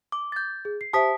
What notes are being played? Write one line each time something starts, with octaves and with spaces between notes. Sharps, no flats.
D6
G6 A6
G#4
C7
G4 C5 E5 A5 D#6 B6